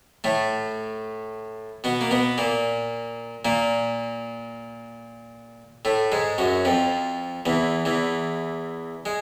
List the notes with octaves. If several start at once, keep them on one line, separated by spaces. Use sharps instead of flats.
A2 A3
B2 B3
A#3
B2 B3
A#2 A#3
A#2 A#3
A2 A3
G#2 G#3
F#2 F#3
F2 F3
E2 E3
E2 E3
G#3